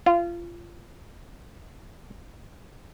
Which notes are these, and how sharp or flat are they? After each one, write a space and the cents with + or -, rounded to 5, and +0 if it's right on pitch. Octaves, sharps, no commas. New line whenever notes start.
F4 -25